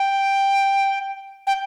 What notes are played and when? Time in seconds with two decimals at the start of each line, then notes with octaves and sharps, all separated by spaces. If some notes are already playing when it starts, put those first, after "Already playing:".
Already playing: G5
1.47 G5